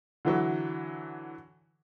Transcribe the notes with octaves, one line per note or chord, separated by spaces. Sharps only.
D3 E3 F#3